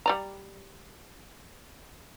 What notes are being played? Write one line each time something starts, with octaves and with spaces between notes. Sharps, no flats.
G3 D5 A#5